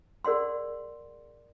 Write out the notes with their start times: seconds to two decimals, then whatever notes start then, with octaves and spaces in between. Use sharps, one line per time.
0.25 G#4 A#4 D5 F#5 C6